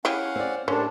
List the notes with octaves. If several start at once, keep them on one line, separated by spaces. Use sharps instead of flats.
C#4 E4 G4 G#4 F5 F#5
C4 D5
A2 G3 C#4 D4 A4 A#4 C5